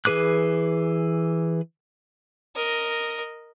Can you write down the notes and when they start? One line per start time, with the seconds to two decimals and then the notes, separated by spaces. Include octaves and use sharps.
0.05 E3 G#4 B4 D6 F#6
2.55 A#4 D#5